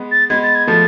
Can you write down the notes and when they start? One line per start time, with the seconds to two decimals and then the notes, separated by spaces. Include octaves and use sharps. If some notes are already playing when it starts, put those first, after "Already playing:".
Already playing: G#3 B3
0.12 A6
0.30 G#3 B3 G#6
0.43 A6
0.55 G#6
0.67 F3 A3 A6